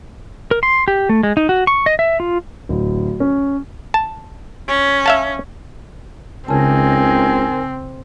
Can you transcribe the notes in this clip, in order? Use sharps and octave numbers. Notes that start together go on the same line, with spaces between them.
A#4
C6
G4
A3
G#3
D#4
F#4
C#6
D#5
E5
F4
D1
C#4
A5
C#4
E5 F5 A5
C#2 C#3 C4 D#4 A#4 G#5 A5